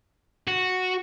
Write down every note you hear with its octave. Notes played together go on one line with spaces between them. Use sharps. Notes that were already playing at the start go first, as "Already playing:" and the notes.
F#4